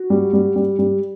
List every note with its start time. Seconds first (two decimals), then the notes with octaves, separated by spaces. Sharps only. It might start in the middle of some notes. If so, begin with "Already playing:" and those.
Already playing: F#4
0.10 G3
0.33 G3
0.56 G3
0.79 G3